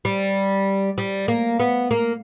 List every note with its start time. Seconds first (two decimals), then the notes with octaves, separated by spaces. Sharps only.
0.05 G3
0.98 G3
1.28 A#3
1.60 B3
1.91 A#3